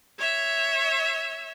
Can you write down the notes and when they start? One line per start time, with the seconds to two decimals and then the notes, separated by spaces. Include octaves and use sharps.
0.19 C#5 E5 E6